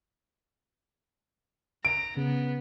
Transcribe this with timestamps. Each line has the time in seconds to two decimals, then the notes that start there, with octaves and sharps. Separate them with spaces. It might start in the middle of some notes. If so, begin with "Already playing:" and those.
1.85 A#5 D7
2.17 C#3 B3